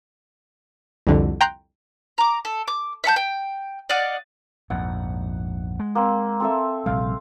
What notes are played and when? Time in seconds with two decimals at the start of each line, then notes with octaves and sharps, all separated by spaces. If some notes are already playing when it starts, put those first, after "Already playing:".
1.07 C2 F2 D3
1.41 G5 A#5 C6 F#6 G6
2.18 A#5 D6
2.45 A4
2.68 D6
3.04 E5 F#5 A5 G6
3.16 G5
3.90 D5 D#5 F5 F#5
4.70 A#1 F2 G#2 F#5
5.80 G#3
5.95 A#3 C4
6.40 C4 A4 E5
6.86 A#1 C3 G3 F5